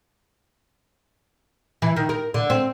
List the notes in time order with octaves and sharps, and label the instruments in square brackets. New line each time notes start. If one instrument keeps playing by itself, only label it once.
[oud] E3
D#3
A#4
D3
C4